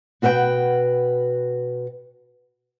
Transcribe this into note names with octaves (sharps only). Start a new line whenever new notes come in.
B2 F#4 B4 E5 G5